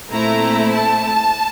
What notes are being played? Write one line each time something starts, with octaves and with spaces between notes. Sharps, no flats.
A#2 A3 C4 E4 A#5
A5